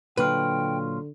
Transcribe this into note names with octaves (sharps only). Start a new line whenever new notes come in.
A#2 D3 F#3 F4 B4 G5